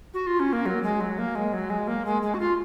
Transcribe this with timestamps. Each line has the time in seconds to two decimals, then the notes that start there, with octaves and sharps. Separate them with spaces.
0.14 F#4
0.27 F4
0.40 C#4
0.53 A#3
0.66 F#3
0.83 G#3
1.01 F#3
1.18 A#3
1.35 G#3
1.53 F#3
1.70 G#3
1.88 A#3
2.05 G#3
2.22 G#3
2.34 F#4
2.40 F4